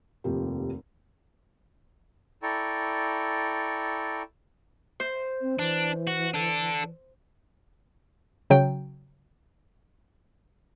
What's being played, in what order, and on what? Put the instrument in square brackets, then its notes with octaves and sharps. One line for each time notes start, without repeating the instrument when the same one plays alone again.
[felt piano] F1 D#2 C3 F3 G4
[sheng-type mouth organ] E4 A4 D5 G5 A#5 C#6
[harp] C5
[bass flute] C4
[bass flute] E3 [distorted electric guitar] D4
[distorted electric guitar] F#4
D4 A4
[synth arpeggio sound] C#3 F#3 G5